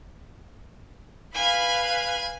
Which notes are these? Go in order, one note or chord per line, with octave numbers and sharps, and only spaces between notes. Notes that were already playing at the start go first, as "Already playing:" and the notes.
B4 F5 G#5 B5